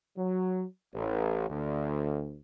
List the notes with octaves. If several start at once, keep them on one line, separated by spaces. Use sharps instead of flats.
F#3
A1
D2